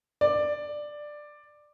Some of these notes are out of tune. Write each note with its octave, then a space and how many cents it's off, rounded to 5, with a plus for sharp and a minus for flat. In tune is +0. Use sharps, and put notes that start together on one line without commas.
D5 +10